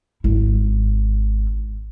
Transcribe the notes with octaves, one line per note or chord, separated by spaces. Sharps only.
G#1 E4